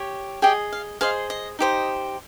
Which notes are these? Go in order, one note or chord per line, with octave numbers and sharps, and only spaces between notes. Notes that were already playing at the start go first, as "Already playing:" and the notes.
Already playing: G4 C#5
G4 G#4 D#5 G5
F5
G#4 C5 D#5 F5
D#5
D#4 G4 C5 D#5